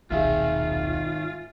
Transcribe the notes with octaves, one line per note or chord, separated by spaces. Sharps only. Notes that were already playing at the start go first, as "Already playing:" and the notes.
D#1 B1 G#2 D#3 F4 G#4 E5 F5